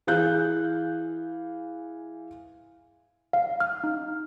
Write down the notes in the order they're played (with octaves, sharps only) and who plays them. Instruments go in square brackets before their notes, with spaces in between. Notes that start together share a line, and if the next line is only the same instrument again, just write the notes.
[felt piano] E3 G#4 F5 F#6 G6
[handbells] F5
F6
D#4